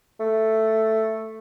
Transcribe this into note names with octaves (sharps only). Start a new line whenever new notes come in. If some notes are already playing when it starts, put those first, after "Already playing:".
A3